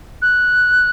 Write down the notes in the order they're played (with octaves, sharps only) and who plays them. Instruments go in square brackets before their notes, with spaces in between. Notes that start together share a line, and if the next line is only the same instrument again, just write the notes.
[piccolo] F#6